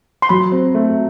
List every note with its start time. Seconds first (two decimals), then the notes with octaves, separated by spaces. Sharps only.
0.22 C6
0.29 F#3 B5
0.52 C4
0.75 A3